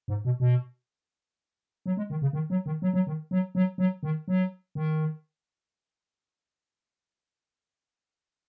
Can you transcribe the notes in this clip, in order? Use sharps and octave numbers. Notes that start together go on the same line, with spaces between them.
G#2
B2
B2
F#3
G#3
D#3
C#3
D#3
F#3
D#3
F#3
F#3
D#3
F#3
F#3
F#3
D#3
F#3
D#3